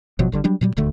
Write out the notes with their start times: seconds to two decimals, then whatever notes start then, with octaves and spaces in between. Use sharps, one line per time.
0.19 G#1 B2 F3 F#3
0.32 G1 D3 G3
0.44 F#3 G3 D4
0.61 A#2 F#3 G3
0.77 D#1 D2 D3 A3